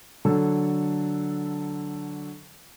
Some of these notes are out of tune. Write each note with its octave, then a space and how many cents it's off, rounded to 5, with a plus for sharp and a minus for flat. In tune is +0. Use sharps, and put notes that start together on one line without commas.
D3 +0 F#3 +5 A4 +0